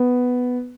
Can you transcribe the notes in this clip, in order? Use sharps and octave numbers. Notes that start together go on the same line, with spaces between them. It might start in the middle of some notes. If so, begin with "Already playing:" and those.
Already playing: B3